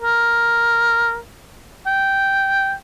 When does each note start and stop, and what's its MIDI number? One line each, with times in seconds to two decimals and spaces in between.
0.03 1.17 70
1.87 2.72 79